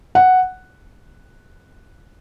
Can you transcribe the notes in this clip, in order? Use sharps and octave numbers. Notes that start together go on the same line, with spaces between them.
F#5